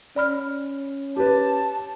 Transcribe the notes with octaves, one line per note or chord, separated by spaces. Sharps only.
C#4 D5 B5 F6
G4 B4 A5